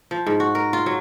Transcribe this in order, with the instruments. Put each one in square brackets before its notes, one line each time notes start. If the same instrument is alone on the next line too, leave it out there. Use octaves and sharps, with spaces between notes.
[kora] F3
G#2
F#4
A#4
F4
F#3